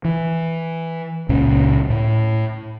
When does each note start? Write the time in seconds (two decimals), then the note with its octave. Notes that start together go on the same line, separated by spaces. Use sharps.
0.05 E3
1.29 C#2 A#2 C#3 C#4
1.90 A2